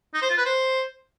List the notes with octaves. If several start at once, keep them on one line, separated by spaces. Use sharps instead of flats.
D#4
C5
F4
B4
C5